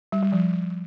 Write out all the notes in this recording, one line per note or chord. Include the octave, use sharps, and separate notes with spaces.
G3
G3
F3